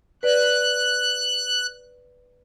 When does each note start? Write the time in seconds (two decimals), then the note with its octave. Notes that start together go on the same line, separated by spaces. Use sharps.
0.23 B4 D5 F#6